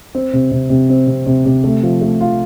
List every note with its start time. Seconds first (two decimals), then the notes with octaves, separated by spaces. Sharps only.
0.15 C4
0.33 C3
0.51 C3
0.70 C3
0.90 C4
1.07 C3
1.26 C3
1.45 C3
1.64 A3
1.83 F3
2.01 A3
2.21 F4